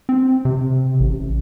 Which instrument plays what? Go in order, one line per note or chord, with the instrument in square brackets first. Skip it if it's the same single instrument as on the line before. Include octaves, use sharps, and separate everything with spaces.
[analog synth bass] C4
C3
A1